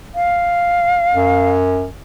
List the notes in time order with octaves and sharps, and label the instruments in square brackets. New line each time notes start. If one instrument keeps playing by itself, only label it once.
[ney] F5
[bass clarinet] F#2